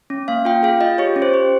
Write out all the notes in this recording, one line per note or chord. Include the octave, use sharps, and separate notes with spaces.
C#4
A#3 F5
F4 G5
G#4 F5
F4 D#5
G4 C#5
C#4
C5
G4